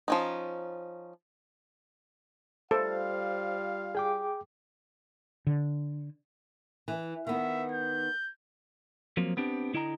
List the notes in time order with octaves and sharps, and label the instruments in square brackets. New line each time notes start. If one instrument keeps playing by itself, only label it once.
[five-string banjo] F3 C#4 D#4
[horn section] G3 F4 F5 [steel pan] A4 [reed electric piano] C5
[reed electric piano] G#4 G5 D6
[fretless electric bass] D3
[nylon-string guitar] E3
[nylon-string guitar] D#3 B3 [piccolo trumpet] E5
[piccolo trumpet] G6
[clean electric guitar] F3 F#3 A#3 C4
B3 C4 D4 G4
D3 E4 D#5 G5 A#5